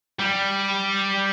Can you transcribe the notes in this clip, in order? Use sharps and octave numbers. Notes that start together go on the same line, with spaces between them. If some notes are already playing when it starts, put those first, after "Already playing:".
G3